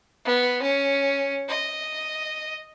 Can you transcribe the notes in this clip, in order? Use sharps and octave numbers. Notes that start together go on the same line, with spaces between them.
B3
C#4
D#5